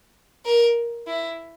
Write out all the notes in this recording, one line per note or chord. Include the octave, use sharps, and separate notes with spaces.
A#4
E4